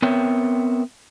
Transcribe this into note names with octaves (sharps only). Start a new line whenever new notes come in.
B3 C4 A#4 C#5 E5 G5